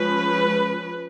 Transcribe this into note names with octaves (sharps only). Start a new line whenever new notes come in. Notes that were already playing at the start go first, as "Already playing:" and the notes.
Already playing: F3 G#3 C#4 B4